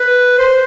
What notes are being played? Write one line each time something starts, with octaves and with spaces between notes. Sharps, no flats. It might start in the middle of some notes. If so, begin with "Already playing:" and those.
Already playing: B4
C5